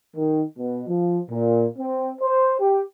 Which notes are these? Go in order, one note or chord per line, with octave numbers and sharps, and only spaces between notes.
D#3
B2
F3
A#2
C4
C5
G4